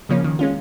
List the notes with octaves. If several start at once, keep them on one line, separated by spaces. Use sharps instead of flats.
C#3 F3 A#3 C#4
D#3
G#3 C#4 F4